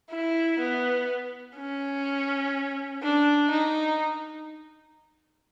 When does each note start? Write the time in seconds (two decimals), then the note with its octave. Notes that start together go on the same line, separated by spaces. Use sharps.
0.11 E4
0.59 B3
1.56 C#4
3.02 D4
3.51 D#4